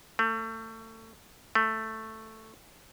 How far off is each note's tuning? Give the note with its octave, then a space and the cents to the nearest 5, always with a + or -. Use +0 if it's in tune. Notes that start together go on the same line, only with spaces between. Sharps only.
A3 +30
A3 +5